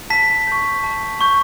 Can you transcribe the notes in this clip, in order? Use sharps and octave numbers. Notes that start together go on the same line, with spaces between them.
A5 B6
C#6 G6
A5
C#6 G6